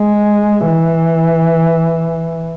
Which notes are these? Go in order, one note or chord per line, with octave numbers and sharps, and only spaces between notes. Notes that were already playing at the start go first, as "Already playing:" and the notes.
Already playing: G#3
E3